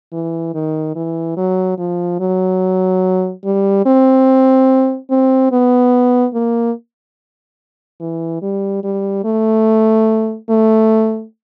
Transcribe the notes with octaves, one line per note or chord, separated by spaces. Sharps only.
E3
D#3
E3
F#3
F3
F#3
G3
C4
C4
B3
A#3
E3
G3
G3
A3
A3